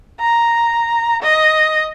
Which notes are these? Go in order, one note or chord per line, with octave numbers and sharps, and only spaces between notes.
A#5
D#5